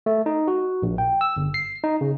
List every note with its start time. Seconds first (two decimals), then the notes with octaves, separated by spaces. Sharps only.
0.06 A3
0.26 D#4
0.48 F#4
0.82 A#1
0.98 G5
1.21 E6
1.37 G1
1.54 C7
1.84 D#4
2.01 C#3